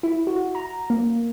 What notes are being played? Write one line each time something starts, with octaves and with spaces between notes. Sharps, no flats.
E4
F#4
A#5
A#3